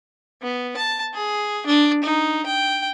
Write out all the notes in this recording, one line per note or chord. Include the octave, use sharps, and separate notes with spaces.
B3
A5
G#4
D4
D#4
G5